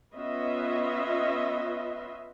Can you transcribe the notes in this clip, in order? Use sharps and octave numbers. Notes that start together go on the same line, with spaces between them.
B3 C#4 F4 B4 D#5 E5